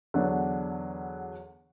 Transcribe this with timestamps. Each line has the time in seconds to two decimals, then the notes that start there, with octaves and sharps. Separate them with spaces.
0.14 E2 D3 F#3 B3 D4